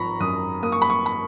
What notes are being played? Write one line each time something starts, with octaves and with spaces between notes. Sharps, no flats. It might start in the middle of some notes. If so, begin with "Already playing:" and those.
Already playing: G#1 F3 A#5 B5 C#6
F#2 D#6
A#3 D#6
C#6
B5
C#6
B5